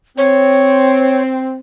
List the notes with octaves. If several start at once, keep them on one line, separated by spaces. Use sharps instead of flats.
C4 C#5